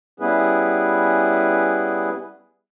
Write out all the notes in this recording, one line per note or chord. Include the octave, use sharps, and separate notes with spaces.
G3 B3 C#4 E4 G#4 B4